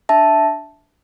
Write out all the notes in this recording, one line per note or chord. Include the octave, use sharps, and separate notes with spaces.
D4 E5 A5